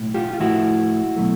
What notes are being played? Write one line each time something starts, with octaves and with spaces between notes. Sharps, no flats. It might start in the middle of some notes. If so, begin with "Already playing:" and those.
Already playing: B1 A2
F4 G4
F4
A2 F3 A3 E4 F#4
B2 F#3 A3